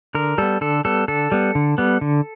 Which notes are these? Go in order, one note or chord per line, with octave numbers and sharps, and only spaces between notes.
D3 A#4
G3 B3 A4
D3 A4
G3 B3 A4
D3 A4
G3 B3
D3
G3 B3
D3